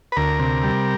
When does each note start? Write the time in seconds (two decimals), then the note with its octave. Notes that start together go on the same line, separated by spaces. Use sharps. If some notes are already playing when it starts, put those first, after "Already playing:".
0.12 B4
0.16 D2 A#4
0.39 C3
0.63 G3